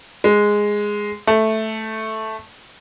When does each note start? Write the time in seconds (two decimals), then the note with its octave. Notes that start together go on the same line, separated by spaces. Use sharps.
0.24 G#3
1.27 A3